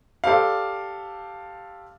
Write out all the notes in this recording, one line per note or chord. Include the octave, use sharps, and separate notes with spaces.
G4 A4 C5 D5 F5